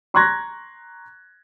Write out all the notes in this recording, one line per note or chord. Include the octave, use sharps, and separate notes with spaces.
A#5 C6 C#6 F#6 G#6 A#6